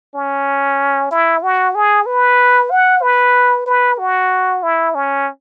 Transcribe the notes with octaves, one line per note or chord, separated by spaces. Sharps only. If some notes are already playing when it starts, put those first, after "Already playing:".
C#4
E4
F#4
G#4
B4
F#5
B4
B4
F#4
E4
C#4